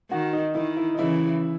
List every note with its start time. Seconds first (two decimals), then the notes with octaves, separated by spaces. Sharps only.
0.11 D#3 F#4
0.33 D#4
0.55 D#3 E4
0.77 E4
0.95 D#4
0.98 C#3 E3 E4